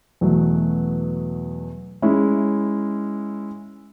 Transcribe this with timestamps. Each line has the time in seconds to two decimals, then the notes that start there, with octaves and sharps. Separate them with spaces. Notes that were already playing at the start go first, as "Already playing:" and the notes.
0.21 E2 B2 F#3 A3
2.02 G#3 C#4 E4